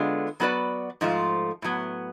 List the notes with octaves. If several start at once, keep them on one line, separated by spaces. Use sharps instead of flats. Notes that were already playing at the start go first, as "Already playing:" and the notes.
Already playing: D3 G#3 B3 F4
F#3 B3 F#4 B4 D5
G#2 F3 A3 F4
A2 F#3 B3